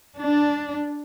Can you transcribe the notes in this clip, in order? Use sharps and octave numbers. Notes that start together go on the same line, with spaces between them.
D4